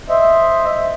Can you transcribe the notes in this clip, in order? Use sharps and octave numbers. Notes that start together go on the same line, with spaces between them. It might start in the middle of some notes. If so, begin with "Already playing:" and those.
C5 D#5 E5